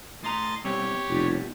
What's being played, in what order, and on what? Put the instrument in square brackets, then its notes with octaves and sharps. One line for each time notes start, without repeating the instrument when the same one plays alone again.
[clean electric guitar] A2 A#5 [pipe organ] D#5 C6 A6
[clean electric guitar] B2 G3 C4 [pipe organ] G4 C#5
[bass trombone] F1 [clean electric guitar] B2 G3